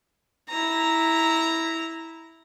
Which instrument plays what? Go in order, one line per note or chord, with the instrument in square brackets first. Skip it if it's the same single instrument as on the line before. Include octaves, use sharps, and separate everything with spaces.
[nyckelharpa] E4 A#5